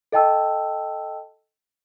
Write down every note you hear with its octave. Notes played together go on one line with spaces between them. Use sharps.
A4 D#5 G5 A5 E6